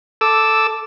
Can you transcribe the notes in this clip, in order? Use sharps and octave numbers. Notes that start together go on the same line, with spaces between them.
A4 D6 E6